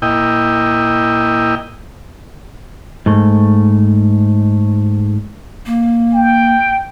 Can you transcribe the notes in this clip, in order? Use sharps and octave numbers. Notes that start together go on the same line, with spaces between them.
A#2 E4 D#5 G5
G#2 A3
A#3
G5